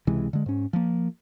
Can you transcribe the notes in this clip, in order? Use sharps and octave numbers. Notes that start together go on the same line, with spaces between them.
C#2 C3 E3 G#3
D3 G#3
G#2 C#4
F3 A#3